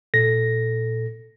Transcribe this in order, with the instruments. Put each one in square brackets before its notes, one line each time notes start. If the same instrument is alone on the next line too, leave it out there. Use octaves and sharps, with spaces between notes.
[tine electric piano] A#2 A4 A#6